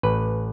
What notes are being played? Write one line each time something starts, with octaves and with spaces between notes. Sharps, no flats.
A1 B4